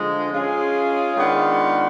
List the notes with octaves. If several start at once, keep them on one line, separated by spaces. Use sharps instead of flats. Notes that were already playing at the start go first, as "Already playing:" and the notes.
Already playing: D3 F3 G#3
G#3 C#4 F4 G#4
D#3 G#3 B3 D4 F4